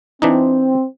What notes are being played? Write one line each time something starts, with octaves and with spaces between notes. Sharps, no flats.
E3 C4 D4 D#4